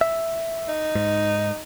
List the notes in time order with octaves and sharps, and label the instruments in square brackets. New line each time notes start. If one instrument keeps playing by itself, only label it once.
[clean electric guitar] E5
[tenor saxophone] D#4
[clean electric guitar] G#2